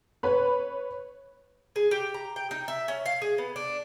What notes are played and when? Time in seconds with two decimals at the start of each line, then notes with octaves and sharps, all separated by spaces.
0.23 B4 C#5 B5
1.76 G#4
1.91 G4
2.14 A#5
2.36 G5
2.51 D#4
2.68 E5
2.88 C#4
3.06 F5
3.22 G#4
3.38 B3
3.56 D4